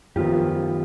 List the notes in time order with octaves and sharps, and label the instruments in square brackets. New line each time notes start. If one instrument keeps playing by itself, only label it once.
[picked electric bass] F#2 D#3 [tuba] F3 [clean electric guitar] B3 F4 G4